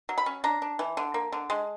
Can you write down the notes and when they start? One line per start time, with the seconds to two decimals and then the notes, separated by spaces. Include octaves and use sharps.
0.09 F#3
0.18 B5
0.26 C#4
0.44 D4 A#5
0.62 D4
0.79 E3
0.97 D3
1.14 A#3
1.32 D3
1.50 G#3